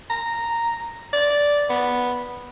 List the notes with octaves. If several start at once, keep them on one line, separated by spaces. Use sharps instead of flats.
A#5
D5
B3